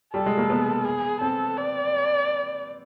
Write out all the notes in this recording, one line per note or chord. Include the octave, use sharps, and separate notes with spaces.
G3 A4
G#3
A#3
B3
G#4
C4 A4
D5